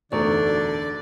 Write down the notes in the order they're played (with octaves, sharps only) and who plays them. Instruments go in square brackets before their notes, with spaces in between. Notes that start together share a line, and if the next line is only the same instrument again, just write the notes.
[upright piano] E1 A3 [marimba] F#2 D#4 C#6 [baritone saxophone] D3 [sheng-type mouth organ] D5